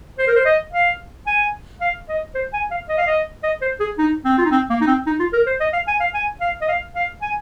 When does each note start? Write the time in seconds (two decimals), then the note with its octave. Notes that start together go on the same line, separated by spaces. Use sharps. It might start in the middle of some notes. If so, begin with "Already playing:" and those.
0.18 C5
0.27 A#4
0.36 C5
0.45 D#5
0.72 F5
1.27 G#5
1.81 F5
2.09 D#5
2.34 C5
2.53 G#5
2.71 F5
2.89 D#5
2.98 F5
3.07 D#5
3.43 D#5
3.61 C5
3.80 G#4
3.98 D#4
4.25 C4
4.38 F4
4.45 D#4
4.51 C4
4.70 A#3
4.81 D#4
4.87 C4
5.06 D#4
5.19 F4
5.33 A#4
5.46 C5
5.60 D#5
5.73 F5
5.88 G#5
6.00 F5
6.14 G#5
6.41 F5
6.61 D#5
6.69 F5
6.95 F5
7.22 G#5